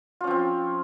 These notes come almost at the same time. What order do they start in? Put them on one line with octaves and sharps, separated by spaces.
F4 C#4 F3 C4